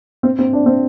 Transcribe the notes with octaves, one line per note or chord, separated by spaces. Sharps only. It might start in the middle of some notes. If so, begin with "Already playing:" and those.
C4
C4
D4
C4